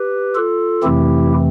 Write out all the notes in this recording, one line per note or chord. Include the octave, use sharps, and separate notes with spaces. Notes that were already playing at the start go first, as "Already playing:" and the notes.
Already playing: G4 B4
F4 A4
F2 C3 E3 A3 C4 E4 G4